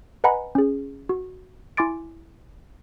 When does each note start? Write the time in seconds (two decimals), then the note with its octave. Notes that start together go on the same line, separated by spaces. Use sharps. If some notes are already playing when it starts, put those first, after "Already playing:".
0.24 B4 D#5 F#5 G#5 A#5 B5
0.55 C#4 G#4
1.09 F#4
1.77 E4 G#5 C6 D6 A6 D7